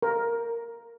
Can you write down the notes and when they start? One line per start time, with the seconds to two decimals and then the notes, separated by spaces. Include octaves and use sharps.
0.02 A#4